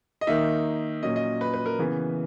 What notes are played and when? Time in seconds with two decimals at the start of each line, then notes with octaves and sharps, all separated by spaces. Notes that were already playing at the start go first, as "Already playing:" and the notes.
0.21 D#5
0.27 D#3 A#3 D#4 E5
1.02 A#2 F#3 C#4 D#5
1.16 D#5
1.41 B4
1.54 B4
1.66 A#4
1.79 C#3 E3 B3